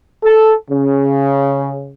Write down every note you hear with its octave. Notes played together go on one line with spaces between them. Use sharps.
A4
C#3